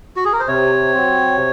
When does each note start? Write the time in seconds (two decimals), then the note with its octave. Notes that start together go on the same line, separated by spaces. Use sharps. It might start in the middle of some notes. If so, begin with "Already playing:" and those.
0.16 F#4
0.25 G#4
0.33 A#4
0.40 C5
0.48 C3 C#5
0.94 F#3 C4
1.37 C3